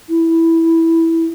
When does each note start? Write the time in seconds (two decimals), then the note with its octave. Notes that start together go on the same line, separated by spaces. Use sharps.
0.09 E4